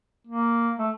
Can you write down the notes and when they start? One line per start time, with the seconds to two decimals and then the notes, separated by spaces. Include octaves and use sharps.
0.27 A#3
0.79 A3